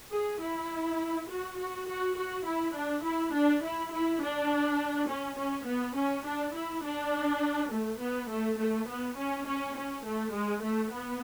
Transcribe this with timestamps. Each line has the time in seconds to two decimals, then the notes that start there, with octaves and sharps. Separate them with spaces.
0.12 G#4
0.41 E4
1.29 F#4
1.58 F#4
1.87 F#4
2.16 F#4
2.46 E4
2.75 D4
3.04 E4
3.33 D4
3.62 E4
3.92 E4
4.21 D4
5.09 C#4
5.37 C#4
5.67 B3
5.96 C#4
6.25 D4
6.54 E4
6.83 D4
7.71 A3
8.00 B3
8.30 A3
8.59 A3
8.88 B3
9.17 C#4
9.46 C#4
9.75 C#4
10.05 A3
10.33 G#3
10.63 A3
10.92 B3